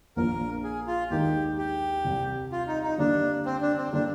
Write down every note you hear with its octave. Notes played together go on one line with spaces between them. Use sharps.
A#1 A#2 F3 A#3 D4 A#4
G#4
F4
D#2 D#3 G#3 D#4 G4 A#4
G4
C2 C3 G3
F4
D#4
D#4
D3 G3 A#3 D4
C4
D4
C4
D3 G3 A#3 D4